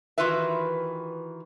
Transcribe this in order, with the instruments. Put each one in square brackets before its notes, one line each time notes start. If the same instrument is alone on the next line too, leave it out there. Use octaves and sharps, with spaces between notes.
[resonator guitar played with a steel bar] D#3 E3 F4 F#4 B4 E5